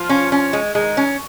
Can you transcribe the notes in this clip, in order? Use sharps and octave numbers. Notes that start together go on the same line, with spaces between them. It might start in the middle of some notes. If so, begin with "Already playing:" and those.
Already playing: F3 F4
C#4
C#4
G#3
D#3 G#3 D#4
C#4